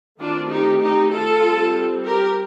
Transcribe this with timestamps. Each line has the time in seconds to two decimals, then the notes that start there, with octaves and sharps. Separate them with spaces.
0.19 D#3 A3 C4 D4 F4
0.50 D#4 G4
0.81 D#4 G4
1.12 F4 A4
1.43 G3 C4
2.05 G4 A#4